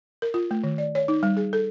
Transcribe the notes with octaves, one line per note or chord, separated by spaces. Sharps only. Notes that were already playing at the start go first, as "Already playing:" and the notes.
A#4
F4
A3
D#3
D5
C#5
D#4
G3
G#4
A4